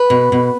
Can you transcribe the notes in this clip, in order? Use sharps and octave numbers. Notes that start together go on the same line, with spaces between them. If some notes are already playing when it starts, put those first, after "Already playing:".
Already playing: B4
B2
B2